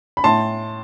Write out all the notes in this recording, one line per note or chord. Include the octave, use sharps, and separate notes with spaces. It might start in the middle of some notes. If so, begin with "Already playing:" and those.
B5
A2 A5 C6